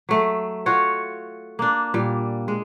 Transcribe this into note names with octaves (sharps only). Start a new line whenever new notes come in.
F#3 A3
F4 F#4 C#5
A#3 D4
A#2 G3
G#3